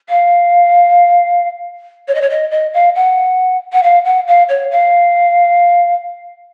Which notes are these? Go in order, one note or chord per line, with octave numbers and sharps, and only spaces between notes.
F5
C#5
D#5
C#5
D#5
D#5
F5
F#5
F#5
F5
F#5
F5
C#5
F5